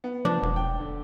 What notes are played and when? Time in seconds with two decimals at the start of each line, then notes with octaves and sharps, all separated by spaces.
0.04 B3
0.25 F3 D4
0.42 E1
0.56 G5
0.79 D3